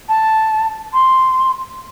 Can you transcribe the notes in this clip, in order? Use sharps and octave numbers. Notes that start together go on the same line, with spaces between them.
A5
C6